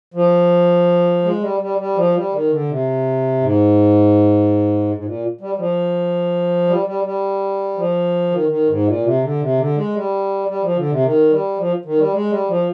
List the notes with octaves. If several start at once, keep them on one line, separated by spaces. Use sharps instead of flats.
F3
G#3
G3
G3
G3
F3
G3
D#3
D3
C3
G#2
G#2
A#2
G3
G3
F3
G3
G3
G3
F3
D#3
D#3
G#2
A#2
C3
D3
C3
D3
G#3
G3
G3
F3
D3
C3
D#3
G3
F3
D#3
G3
G#3
G3
F3